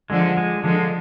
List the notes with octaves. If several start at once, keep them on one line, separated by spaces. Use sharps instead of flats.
D3 F3 G#3
G#3
D3 F3 G#3